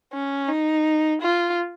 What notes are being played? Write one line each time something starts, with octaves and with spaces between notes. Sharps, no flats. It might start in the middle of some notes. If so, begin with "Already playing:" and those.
C#4
D#4
F4